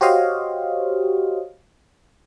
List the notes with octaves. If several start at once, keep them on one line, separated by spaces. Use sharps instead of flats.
F#4 G4 C5 C#5 D#5 F5